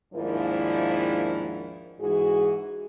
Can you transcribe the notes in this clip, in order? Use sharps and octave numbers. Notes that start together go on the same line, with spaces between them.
D#2 G#2 F3 D4 E4 A#4
G#2 E3 F#4 G#4